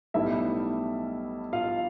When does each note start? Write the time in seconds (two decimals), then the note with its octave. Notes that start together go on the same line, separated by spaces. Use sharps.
0.14 B1 A2 G3 B3 E4 E5
1.53 F4 F5